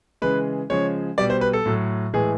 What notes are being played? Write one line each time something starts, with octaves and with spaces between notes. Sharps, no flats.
C#3 E3 G#3 B4
C#3 F3 G#3 C#5
B2 G3 D5
C5
B4
A4
A2 F#3
A2 E3 G#3 G#4